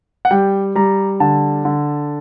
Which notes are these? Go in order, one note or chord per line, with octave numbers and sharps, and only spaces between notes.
F#5
G3 G5
G3 A#5
D3 A5
D3